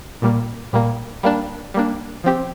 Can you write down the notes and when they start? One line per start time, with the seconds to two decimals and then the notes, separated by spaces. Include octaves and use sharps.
0.22 A#2 G3 A#3
0.73 A#2 G3 A#3
1.23 G3 A#3 D4
1.74 G3 A#3 D4
2.24 F3 C4 G4